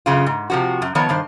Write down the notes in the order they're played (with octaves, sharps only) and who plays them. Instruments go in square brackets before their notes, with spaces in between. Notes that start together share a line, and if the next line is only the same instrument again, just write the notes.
[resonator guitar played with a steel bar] F#2 C#3 F4
G#2
C3 F3 F#4
F#2
D#3 F3 B3 C#5
G2 D#3 C5